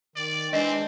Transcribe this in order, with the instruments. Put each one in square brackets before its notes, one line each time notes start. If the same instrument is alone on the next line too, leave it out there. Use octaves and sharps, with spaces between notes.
[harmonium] D#3 [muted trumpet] D5
[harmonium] E3 G#3 D4 [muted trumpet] C4 [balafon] D#5